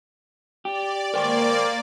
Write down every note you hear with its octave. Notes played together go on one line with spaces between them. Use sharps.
G4 D5
A#3 A#4 C5 D5 G5